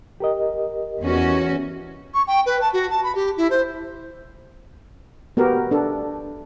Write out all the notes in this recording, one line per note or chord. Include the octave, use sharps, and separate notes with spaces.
G4 A#4 D#5
E2 C#4 F#4
C#6
G5
B4
A5
F#4
A5
B5
G4
E4
C5
B3 F#4 G4 A#4
D4 A4